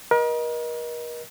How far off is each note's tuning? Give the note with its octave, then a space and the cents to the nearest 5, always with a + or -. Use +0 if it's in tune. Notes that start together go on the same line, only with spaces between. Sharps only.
A#4 +40 D#5 +0